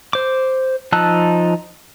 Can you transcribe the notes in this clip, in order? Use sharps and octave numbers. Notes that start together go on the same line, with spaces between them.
C5 D6
F3 D#4 A5 E6 F#6